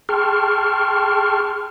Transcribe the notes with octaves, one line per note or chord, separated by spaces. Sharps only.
G#4 G5 A5 C6 C#6 F6